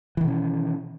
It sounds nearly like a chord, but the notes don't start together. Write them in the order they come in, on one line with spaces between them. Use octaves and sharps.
E3 D#3 B2 C#4